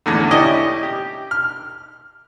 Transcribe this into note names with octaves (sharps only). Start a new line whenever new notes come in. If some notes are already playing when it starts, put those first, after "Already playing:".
E2 A2 D3
C#4 E4 G4 D5 D#5
G4
F6